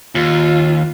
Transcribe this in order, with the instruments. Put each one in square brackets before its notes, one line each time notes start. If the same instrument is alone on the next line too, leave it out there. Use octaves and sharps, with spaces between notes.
[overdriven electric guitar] D#2 [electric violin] F4